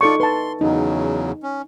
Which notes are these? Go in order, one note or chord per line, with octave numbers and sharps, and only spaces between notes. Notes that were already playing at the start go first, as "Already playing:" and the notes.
D#4 F4 A4 D5 C#6
B4 A5 C6
E2 C#3 F#3 D#4
C#4